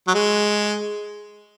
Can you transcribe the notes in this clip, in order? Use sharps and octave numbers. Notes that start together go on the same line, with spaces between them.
F#3
G#3